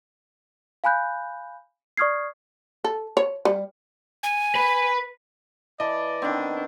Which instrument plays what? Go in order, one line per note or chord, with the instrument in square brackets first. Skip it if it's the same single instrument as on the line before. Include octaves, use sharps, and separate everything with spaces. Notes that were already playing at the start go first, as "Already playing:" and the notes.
[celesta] F5 G#5 B5 F#6 G6
D5 C#6 D#6 F6 G#6 C7
[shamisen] A4
C#5
G3
[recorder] G#5
[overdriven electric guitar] B4 B5
[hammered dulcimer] E3 [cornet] D5 [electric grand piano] D#5 A5
[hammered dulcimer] D#3 B3 C4 [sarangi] D4